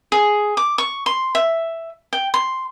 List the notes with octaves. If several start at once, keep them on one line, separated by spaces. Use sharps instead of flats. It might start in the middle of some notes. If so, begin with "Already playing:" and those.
G#4
D6
C#6
C6
E5
G5
C6